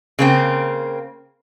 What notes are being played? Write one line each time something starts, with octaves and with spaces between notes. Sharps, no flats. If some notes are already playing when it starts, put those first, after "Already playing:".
C#3 A#3 C4